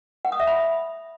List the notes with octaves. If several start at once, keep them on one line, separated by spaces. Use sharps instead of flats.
F#5
D#6
E5
B5